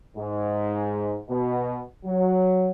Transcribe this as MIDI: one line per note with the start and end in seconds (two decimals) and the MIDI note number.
0.17 1.17 44
1.29 1.81 47
2.05 2.71 54